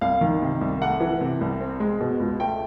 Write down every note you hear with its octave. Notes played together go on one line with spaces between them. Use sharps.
C2 F5
D#3
C3
C2
A3 F#5
E3
C3
C2
C4
G#3
B2
C#2
A3 G5